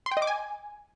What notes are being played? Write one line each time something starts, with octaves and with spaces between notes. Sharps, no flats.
C6
G5
D#5
D6
G#5